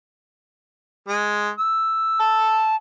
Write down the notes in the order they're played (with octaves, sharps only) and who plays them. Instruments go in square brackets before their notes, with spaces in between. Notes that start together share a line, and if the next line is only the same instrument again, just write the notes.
[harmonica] G#3
E6
[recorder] A5